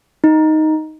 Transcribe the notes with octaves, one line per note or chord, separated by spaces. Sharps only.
D#4